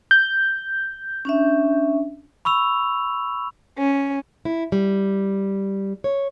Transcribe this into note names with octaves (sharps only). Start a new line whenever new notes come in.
G6
C#4 D4 E5
B5 C#6 E6 F7
C#4
E4
G3
C#5